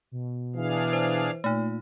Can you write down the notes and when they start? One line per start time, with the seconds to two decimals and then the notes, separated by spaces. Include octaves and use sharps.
0.12 B2
0.56 E3 D4 G#4 F5
0.93 C5
1.44 A#2 A3 D#4